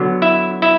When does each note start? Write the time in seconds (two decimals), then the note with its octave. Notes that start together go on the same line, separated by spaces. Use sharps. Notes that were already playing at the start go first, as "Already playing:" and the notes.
Already playing: D3 F#3 B3
0.22 E4 E5
0.62 E4 E5